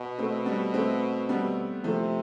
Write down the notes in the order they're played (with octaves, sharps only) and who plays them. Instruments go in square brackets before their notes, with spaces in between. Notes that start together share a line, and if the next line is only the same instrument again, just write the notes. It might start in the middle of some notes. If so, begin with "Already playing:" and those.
Already playing: [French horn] B2
[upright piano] A3 C4
G3 B3
A3 C4
G3 B3
[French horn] C3 [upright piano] F3 A3